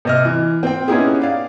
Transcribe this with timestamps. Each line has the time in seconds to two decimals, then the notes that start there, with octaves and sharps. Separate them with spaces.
0.05 C3 D#5 F6
0.25 E3
0.63 C4 G5
0.88 B3 C#4 D#4 E4 G4 G#4
1.21 D5 F5